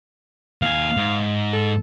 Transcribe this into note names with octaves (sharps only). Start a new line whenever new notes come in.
D#2 F5 G#5
G#2
A4